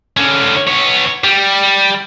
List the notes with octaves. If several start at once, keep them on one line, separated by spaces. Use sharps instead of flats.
D3 C#4
B3 C#5
G3